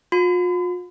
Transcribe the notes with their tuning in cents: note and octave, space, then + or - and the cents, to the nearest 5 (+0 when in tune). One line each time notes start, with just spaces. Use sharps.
F4 +45 B5 +45